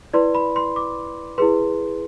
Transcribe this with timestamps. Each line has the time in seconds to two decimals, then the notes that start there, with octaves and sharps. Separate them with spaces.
0.13 E4 B4 D5 C6
0.35 B5
0.56 C6
0.76 D6
1.38 E4 G#4 B4 C6